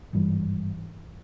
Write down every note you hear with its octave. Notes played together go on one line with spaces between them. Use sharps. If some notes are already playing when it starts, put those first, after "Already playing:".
G#1 G2 E3 G3